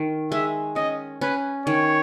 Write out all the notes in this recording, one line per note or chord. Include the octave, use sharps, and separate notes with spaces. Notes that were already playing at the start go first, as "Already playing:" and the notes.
Already playing: D#3
G#3 E5
C#4 D#5
C#4 B4
D#3 C#5